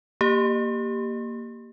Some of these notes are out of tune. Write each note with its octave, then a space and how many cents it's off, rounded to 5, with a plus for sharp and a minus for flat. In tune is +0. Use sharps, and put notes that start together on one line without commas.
A#3 +0 G4 +0